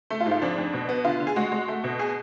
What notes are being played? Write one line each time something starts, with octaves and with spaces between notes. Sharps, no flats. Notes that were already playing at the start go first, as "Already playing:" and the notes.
A3
F4
G#2
F4
F2 D4
F2
B2
B3
D3 F4
D3
G#4
G#3 F#4
G#3
A3
B2
G#4